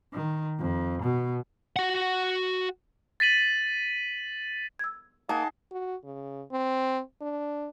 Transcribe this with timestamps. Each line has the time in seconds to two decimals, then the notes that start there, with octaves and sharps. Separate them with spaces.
0.14 D#3
0.59 F2
1.03 B2
1.76 F#4 F#5
3.20 A6 B6 D#7 F#7
4.79 E6 G#6
5.29 A#3 D#4 G#4 F#5 A5
5.71 F#4
6.04 C#3
6.52 C4
7.21 D4